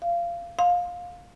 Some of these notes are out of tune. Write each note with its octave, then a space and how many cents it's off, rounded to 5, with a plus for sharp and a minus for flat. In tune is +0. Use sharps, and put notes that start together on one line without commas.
F5 -20
F5 +20